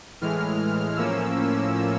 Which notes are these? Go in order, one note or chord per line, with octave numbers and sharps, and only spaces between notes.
A2 E3 G#3 F6
A2 F3 A#3 C#4 E6